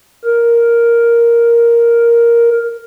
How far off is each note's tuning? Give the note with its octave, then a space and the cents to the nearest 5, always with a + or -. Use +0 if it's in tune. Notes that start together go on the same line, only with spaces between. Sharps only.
A#4 +5